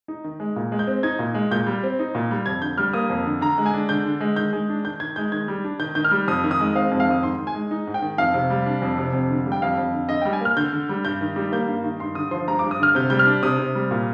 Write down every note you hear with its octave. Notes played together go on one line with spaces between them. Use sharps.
D#4
D#3
G#3
A#2
G#3
G6
C4
D#4 G#6
A#2
G#3
A#2 G6
G3
C4
D#4
A#2
G3
F2 G#6
D3 G6
G3 F6
A#3 D#6
F2
D3
D3 A#5
G#3
G#5
D4
D3 G6
D3
G#3
D#3 G6
G#3
D4
D#3 G6
D#3 G#6
G#3 G6
D#3 G#6
G3
D4
D#3 G6
D#3 G6
F6
G3
F2 D#6
D#3
D#6
G#3
C4 F5
F2
F5
D#3 D#6
G#2 C6
D#3
G#5
G#3
D#4
G#2
G5
D#3
F2 F5
C3
G3
D4
F2
C3
F2
D3
G3
G5
F2 F5
F2
D3
D3 D#5
G3 G5
G#5
A#3 F6
D3 G6
D3
G3
G2 G6
D#3
G3
A#3 G6
G2
D#3
G2 C6
D3 D#6
F3 C6
G2 A#5
G2 D6
D#6
D3 F6
C3 G6
G3 G6
F6
D4
C3 D#6
C3
G3
A#2